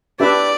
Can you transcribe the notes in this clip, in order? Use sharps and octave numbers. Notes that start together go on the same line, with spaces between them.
D4 G4 B4 D5 E5